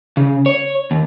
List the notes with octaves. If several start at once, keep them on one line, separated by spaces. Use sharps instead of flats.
C#3
C#5
D#2